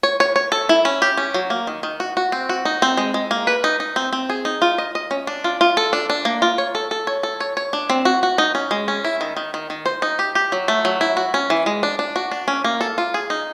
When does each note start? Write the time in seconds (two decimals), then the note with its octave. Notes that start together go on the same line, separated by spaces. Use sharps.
0.03 C#5
0.20 C#5
0.36 C#5
0.52 A4
0.69 E4
0.85 C#4
1.02 G4
1.17 C#4
1.34 F#3
1.50 A#3
1.67 D#3
1.83 D#3
2.00 F#4
2.17 F#4
2.32 C4
2.49 F#4
2.65 D#4
2.82 C4
2.97 G#3
3.14 G#3
3.31 A#3
3.47 B4
3.64 D#4
3.80 D#4
3.96 C4
4.13 C4
4.30 G#4
4.45 D#4
4.62 F4
4.78 D#5
4.95 D#5
5.11 C#4
5.27 D4
5.44 F4
5.61 F4
5.77 A4
5.93 D4
6.10 D4
6.25 A#3
6.42 F4
6.58 C#5
6.75 A4
6.91 A4
7.07 C#5
7.23 A4
7.40 C#5
7.57 C#5
7.73 D4
7.90 C4
8.05 F#4
8.23 F#4
8.38 D#4
8.55 C#4
8.71 G#3
8.88 C#4
9.05 E4
9.21 D#3
9.37 D#3
9.54 D#3
9.70 D#3
9.86 C5
10.02 D#4
10.19 G4
10.35 G4
10.52 F#3
10.68 A3
10.85 F#3
11.01 E4
11.17 F#4
11.34 C#4
11.50 E3
11.66 G#3
11.83 D4
11.99 D4
12.16 F#4
12.32 D4
12.48 C#4
12.64 A#3
12.81 A4
12.98 F4
13.14 G#4
13.30 D#4